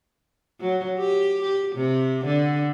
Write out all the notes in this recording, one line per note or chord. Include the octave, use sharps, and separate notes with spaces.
F#3
G4
G4
C3
D3